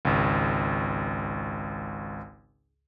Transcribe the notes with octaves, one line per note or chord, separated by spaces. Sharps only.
G#1 C#2